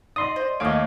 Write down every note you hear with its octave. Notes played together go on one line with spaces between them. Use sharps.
D#4 D5 D#5 C6 D#6
C5
D#2 A3 C#4 C#5 D#5 F5 D6 D7